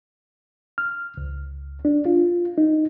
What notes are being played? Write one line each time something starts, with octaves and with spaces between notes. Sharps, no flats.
F6
C#2
D4
F4
D#4